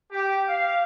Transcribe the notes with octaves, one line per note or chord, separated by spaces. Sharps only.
G4
F5